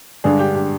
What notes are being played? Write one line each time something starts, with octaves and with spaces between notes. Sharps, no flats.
G2 D3 G#3 D4 G#4
G4
G4